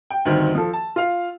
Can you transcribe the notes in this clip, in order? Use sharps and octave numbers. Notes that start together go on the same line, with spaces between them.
G5
D2 G2 D#3 C4
F3 A4
A5
F4 F5